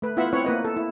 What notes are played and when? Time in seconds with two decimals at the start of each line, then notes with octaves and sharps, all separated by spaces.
0.02 A3 B4
0.17 B3 E4 F4 E5 F#5
0.33 C4 E4 C#5 F#5
0.44 A#3 B4 D#5
0.65 A4
0.77 E4